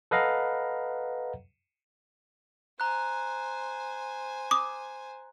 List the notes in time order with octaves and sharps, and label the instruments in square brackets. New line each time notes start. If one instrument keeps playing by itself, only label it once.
[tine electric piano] A4 B4 D#5 F5 F#5 A#5
[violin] C5 G#5 [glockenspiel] A#5 F#6
[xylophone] D6 D#6